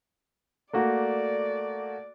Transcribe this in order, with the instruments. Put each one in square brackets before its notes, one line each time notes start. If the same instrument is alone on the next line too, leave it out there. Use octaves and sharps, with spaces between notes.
[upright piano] A3 A#3 F#4 [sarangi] D5